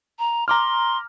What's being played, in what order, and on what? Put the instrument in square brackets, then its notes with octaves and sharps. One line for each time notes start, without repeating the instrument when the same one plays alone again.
[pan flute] A#5
[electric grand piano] A#5 D6 F6 [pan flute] C6